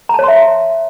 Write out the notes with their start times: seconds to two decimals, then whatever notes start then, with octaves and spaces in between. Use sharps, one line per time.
0.09 A#5
0.14 A5
0.19 C#5
0.24 C6
0.28 E5